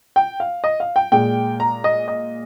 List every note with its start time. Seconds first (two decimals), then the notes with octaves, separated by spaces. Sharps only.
0.16 G5
0.40 F5
0.64 D#5
0.80 F5
0.96 G5
1.12 A#2 G#3 G5
1.60 A#5
1.84 D#5
2.08 D#5